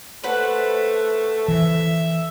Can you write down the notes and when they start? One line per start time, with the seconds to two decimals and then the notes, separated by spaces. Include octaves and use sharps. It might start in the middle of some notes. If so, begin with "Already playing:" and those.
0.24 A3 B4 C5 F#5
1.48 E3 E5